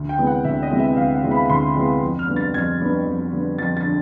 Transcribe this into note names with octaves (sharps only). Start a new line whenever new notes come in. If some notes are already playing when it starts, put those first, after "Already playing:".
Already playing: D2
G5
C3 E3 G#3 B3
F#5
D2 E5
D#5
C3 E3 G#3 B3
E5
D2 F5
F#5
C3 E3 G#3 B3
B5
B5
D2 C6
C3 E3 G#3 B3
F2
F6
D3 G3 B3
A6
F2 G#6
D3 G3 B3
F2
D3 G3 B3
F2 A6
A6
D3